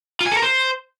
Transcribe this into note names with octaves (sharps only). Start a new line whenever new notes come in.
F4
G#5
A4
A#4
C5